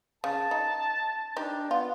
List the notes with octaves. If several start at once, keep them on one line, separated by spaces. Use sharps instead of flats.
C#3 A5
D#4
D4 D#4 G4
B3 F4